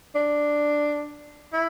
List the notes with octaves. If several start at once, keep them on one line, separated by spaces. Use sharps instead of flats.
D4
E4